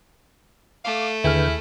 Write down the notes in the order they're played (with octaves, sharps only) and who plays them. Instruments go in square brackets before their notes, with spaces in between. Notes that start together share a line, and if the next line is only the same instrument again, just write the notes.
[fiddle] A3 [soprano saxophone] F5 [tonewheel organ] D6
[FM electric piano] D#2 G#4 F6 [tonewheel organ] D3 B4 G5 [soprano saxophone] E4